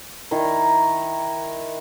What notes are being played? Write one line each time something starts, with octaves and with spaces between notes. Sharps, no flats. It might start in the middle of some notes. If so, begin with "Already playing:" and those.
D#3 E4 A#4